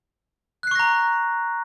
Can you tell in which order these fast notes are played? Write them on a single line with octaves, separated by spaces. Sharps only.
F#6 C7 C#6 A#6 A#5